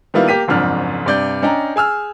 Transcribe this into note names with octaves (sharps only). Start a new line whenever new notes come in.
D#3 G3 A#3 B3 E4 F4
A#3 G4 B6 D#7
F#1 F2 G#2 D4 F6
G2 C3 D5 G6
C#4 D4 D#5 G5 A#5
G#4 G#5 E6 F6